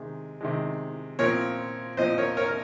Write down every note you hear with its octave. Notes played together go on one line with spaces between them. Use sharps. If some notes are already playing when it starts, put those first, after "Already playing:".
Already playing: C3 D#3 G#3
C3 D#3 G#3
A#2 F3 C4 A#4 C#5
A#2 F3 C4 C5 D#5
A#4 C#5
A#4 C#5
A#4